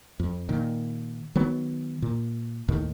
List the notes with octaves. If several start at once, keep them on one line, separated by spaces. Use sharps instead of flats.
F2
A#2 D#3
D#3 F#3 B3
A#2
D#2 A2 D#3